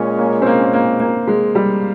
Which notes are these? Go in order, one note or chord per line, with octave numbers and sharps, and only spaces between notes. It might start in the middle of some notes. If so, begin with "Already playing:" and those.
Already playing: A#2 G#3 C#4
A#3
C4
A#3
A#3
A#3
G#3
G3